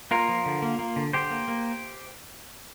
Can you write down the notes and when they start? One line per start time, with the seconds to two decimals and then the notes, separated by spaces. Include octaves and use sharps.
0.11 A#3 F4 A#4
0.29 F3
0.46 D3
0.62 A#3
0.79 A#3
0.96 D3
1.13 D3 G4 C5
1.31 A#3
1.48 A#3